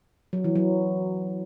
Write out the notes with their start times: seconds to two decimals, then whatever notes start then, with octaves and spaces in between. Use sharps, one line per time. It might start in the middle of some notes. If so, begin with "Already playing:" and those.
0.33 F#3
0.44 E3
0.56 F#3